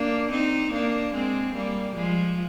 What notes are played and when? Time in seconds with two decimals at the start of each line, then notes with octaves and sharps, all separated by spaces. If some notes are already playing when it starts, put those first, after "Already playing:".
Already playing: A#3 D4
0.31 C4 D#4
0.72 A#3 D4
1.13 G#3 C4
1.54 G3 A#3
1.95 F3 G#3